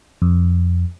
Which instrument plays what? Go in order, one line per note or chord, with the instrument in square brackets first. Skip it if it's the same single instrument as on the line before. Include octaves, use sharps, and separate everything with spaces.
[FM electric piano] F2